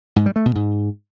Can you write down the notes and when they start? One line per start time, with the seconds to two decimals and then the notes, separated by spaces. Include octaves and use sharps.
0.16 G#2
0.26 G3
0.36 A3
0.46 B2
0.55 G#2